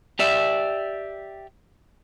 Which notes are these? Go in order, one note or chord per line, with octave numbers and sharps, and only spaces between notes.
G4 D5 E5